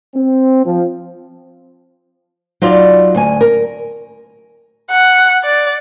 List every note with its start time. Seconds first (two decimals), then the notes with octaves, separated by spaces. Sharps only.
0.15 C4
0.66 F3
2.62 F#3 D#4 F4 D5
3.14 D2 G#5
3.41 A#4
4.91 F#5
5.44 D5